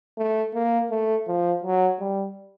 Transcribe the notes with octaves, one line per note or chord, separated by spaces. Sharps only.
A3
A#3
A3
F3
F#3
G3